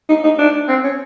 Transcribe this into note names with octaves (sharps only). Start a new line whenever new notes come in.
D#4
D#4
D4
C4
C#4